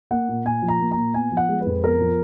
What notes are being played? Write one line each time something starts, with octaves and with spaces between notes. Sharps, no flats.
A#3 F#5
A#2
A#2 G#5
F3
A#5
A#3
A#5
A#2
B3 G#5
F3
F#5
G#3
B4
F2
B3 A#4
F3